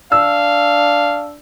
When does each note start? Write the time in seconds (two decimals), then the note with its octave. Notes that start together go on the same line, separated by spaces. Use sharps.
0.12 D4 F5 E6